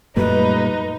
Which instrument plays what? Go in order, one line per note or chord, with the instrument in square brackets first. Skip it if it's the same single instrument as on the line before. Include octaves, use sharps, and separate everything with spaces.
[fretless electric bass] F#2 F#3 A3 [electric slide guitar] A#2 G3 [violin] D#4 [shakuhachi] B4